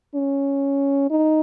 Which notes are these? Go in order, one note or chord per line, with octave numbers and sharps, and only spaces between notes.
C#4
D#4